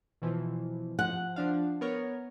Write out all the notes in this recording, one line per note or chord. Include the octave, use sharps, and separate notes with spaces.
B2 E3 F3
F3 F#5
F3 D4 F5
B3 A#4 C#5